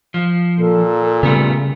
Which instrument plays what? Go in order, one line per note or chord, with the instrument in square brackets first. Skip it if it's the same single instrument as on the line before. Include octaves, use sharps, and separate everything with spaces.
[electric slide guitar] F3
[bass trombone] A#2 [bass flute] A4
[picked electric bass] C#3 [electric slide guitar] G3 A3 B3